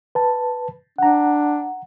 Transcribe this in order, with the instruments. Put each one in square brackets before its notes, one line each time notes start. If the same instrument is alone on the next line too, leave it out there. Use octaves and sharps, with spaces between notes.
[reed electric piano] B4 A5
[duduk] D4 [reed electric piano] F#5 A#5